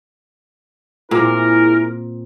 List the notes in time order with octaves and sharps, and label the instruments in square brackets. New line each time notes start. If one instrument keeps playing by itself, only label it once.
[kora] A#2 C4 [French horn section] E4 G#4 [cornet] A#4